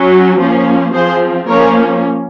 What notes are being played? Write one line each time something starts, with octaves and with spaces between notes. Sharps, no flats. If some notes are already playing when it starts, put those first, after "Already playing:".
Already playing: F#3 C#4
F3 A#3 C#4
F3 C4 G#4 C5
F3 A#3 C#4 A#4 C#5